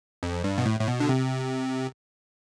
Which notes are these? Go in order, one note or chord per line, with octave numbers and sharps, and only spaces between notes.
F2
G2
B2
A2
A2
B2
D3
C3